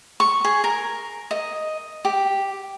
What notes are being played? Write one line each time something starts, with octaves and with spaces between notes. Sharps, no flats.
C#6
G#4
A#4
D#5
G4